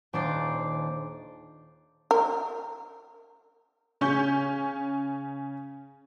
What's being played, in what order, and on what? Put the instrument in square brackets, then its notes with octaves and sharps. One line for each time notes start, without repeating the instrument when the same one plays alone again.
[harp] D#1 D4 C5 D5 D6 C7
[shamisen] A#4
[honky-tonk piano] C#3 C#4 C#6 G6